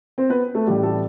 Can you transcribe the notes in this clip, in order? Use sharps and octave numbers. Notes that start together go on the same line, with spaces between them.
C4 C5
B3 B4
A3 A4
A1 A2 G3 G4
A3 A4